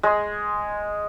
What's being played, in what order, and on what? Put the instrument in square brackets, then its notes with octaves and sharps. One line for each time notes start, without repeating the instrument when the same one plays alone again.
[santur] G#3